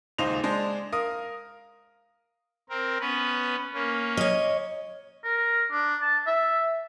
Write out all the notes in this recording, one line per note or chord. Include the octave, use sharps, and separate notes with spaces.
D#1 C#2 D#4 C5 F7
G#3 D4 G#4 C5
A#4 F5 D#6
C4 A#4
B3 C#4 B4
A#3 C#4
C#5 D#5
A#4
D4
A5
E5